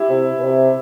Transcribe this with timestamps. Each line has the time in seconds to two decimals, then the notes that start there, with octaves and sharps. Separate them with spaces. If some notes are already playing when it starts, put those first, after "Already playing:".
Already playing: E4 G4
0.09 C3
0.38 B2
0.44 C3